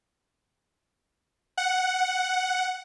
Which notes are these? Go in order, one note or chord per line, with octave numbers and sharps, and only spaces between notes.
F#5